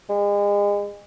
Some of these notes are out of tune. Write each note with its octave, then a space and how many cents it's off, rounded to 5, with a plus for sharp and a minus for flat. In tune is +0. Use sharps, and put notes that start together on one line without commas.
G#3 -35